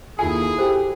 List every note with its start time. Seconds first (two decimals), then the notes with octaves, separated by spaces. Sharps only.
0.19 D#2 E4 F4 G#4 A4 G#5
0.58 F#4 G4 A4 C5